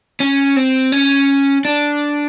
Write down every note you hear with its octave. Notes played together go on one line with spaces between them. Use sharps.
C#4
C4
C#4
D4